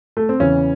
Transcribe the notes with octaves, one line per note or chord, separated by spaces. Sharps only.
A3
C4
E2 C#3 E3 C#4